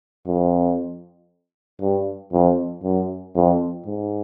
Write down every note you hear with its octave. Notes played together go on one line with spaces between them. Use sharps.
F2
G2
F2
F#2
F2
G#2